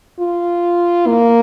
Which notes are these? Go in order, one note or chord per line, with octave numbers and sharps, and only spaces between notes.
F4
A#3